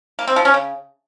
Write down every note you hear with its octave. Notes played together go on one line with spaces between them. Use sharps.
A#3
C4
F3
C#4
C#3